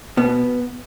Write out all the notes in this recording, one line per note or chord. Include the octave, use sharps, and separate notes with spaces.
B2 B3